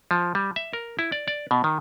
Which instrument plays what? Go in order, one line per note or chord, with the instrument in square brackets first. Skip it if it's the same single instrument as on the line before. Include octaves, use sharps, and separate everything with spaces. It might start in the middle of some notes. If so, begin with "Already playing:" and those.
[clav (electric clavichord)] F3
G3
E5
A#4
E4
D5
D5
B2
D#3